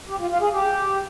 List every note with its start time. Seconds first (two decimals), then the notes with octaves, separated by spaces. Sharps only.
0.09 G4
0.20 F4
0.30 F4
0.41 G#4
0.52 G4